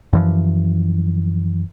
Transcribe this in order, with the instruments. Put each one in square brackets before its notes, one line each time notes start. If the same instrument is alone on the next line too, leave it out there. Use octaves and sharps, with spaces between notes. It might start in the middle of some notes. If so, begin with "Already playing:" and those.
[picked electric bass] F#2 E3 F3